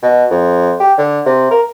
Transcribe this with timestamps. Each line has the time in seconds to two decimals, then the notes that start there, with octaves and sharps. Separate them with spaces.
0.02 B2
0.31 F2
0.80 G4
0.98 D3
1.26 C3
1.51 A#4